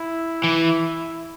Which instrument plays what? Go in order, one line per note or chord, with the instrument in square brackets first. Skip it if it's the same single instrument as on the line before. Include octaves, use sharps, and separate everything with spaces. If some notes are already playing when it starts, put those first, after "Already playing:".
Already playing: [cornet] E4
[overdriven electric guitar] E3